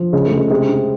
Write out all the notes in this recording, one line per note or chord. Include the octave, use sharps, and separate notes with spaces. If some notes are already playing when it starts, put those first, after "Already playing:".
Already playing: F3
C#3 G#3
A3
C#3
G#3
C3 G#3
C3